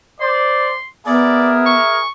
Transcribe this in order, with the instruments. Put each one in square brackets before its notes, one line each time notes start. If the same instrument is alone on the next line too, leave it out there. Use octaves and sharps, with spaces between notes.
[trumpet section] C5 D5 [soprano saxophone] C6
[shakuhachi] B3 [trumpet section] G#4 A#4 E5 [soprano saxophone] D5
[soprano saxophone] C#6